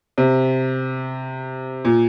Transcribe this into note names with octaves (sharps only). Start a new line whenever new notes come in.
C3
A#2